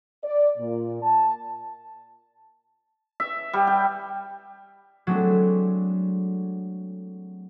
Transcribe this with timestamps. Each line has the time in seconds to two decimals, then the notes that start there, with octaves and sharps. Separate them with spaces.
0.24 D5
0.58 A#2
1.02 A5
3.20 E5
3.53 G3
3.67 G5
5.07 F#3 G#3 A3 C4 D4